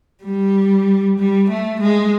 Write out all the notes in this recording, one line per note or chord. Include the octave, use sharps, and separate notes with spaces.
G3
G3
A3
G#3